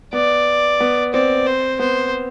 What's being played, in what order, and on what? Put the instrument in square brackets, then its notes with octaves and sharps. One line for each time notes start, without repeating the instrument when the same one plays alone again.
[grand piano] B3 [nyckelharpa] D5
[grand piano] B3
[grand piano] C4 [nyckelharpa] D5
[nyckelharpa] C5
[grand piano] B3 [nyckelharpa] C5